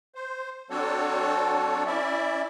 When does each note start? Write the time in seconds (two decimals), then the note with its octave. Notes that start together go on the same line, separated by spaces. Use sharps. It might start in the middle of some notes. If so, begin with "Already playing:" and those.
0.15 C5
0.70 F#3 C4 D4 F#4 A4 C#5
1.86 C#4 E4 D5 E5